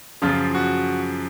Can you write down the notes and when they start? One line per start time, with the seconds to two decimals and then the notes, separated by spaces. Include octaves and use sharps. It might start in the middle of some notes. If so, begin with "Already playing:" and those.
0.22 F#2 C#3 F3 F4
0.55 F#4